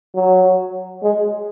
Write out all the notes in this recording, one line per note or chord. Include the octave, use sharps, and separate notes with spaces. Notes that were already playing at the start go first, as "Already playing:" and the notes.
F#3
G#3